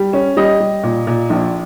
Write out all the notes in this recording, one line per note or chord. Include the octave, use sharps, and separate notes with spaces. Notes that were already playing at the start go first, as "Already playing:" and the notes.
Already playing: G3
C#4
G3 D#5
G3
A#2
A#2
A#1